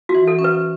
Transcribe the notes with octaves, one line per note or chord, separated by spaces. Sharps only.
F#4
E3
A4
C#4
B4